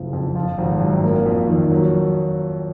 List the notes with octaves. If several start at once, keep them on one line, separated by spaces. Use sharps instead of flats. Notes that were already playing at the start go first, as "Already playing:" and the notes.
Already playing: F#1 F3
F2
F3
G#1
F#2
A#3
F2
D#3
F#3